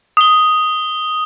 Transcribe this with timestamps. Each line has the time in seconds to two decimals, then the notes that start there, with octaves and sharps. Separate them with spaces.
0.17 D#6 G7